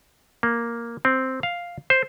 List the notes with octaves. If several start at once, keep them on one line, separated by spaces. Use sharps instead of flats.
A#3
C4
F5
C5